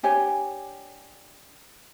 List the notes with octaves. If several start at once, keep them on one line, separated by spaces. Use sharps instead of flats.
D4 G4 C#5 G#5